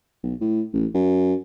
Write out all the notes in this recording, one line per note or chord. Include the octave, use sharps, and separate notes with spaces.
B1
A2
A1
F#2